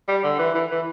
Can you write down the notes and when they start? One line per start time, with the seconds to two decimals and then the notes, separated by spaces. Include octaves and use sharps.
0.09 G3
0.24 D3
0.39 E3
0.55 E3
0.70 E3